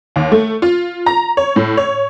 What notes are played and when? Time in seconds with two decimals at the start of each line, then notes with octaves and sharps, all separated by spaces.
0.16 D#2
0.32 A3
0.62 F4
1.06 A#5
1.37 C#5
1.56 A2
1.77 C#5